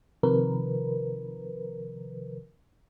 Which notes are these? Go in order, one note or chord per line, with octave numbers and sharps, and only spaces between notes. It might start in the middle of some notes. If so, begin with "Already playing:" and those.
C3 D#3 F3 A#4 B4